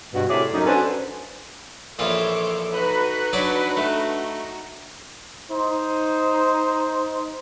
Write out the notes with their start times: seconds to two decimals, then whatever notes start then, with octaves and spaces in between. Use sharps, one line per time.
0.14 G2 B2 F#4
0.29 A2 C3 G#4 C#5 D5 E5
0.53 F#2 D#4
0.65 C#4 D4 F#4 A4 B4 C5
1.99 A#1 E3 F4 A4 C5 C#5 D6
2.73 D#4 F#4 B4
3.33 F#3 D4 C#5 D5
3.77 A3
5.50 D#4 C5